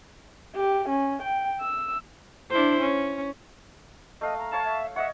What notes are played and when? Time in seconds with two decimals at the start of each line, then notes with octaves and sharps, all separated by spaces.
0.56 G4
0.89 C#4
1.23 G5
1.60 E6
2.51 D4 E4 C5
2.80 C#4
4.21 A3 D#5 F5
4.38 A#5
4.52 C#5 F5 A5
4.65 E5
4.96 C#5 D#5 E5 F#5